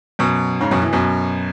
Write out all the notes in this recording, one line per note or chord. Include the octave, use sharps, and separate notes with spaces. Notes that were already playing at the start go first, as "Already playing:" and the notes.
F#2 B2
G#2 C#3
F#2 B2
B2 E3
F#2 B2